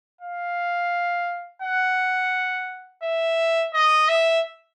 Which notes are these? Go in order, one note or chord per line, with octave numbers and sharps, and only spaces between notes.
F5
F#5
E5
D#5
E5